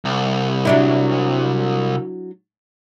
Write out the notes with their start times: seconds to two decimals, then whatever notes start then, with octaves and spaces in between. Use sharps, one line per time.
0.05 C2
0.65 F#3 D4 E4